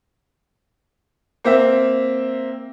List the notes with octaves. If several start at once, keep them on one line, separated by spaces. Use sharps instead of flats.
A#3 C4 E5